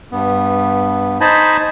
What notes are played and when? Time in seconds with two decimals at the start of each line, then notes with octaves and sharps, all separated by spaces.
0.12 G2 B3
1.21 D#4 C5 D#5 G#5 A5 B5